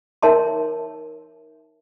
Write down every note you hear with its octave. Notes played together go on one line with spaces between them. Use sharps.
D#4 A#4 C#5 E5 A5 C6